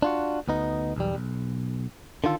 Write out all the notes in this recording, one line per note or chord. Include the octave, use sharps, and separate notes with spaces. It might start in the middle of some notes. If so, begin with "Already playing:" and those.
D4 F4 F#4
D2 B3 D#4
B1 E2 G3
B1
D3 D#3 F4 A4